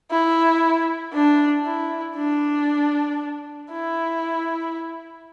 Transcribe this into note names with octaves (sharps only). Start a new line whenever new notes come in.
E4
D4
E4
D4
E4